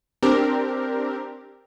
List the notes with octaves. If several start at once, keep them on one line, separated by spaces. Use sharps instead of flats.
C4 D4 G4 A#4